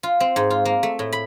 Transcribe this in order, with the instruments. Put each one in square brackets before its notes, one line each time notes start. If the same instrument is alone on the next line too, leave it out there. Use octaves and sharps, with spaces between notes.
[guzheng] F4
C4
G#2
F4
A#3
A3
A2
B5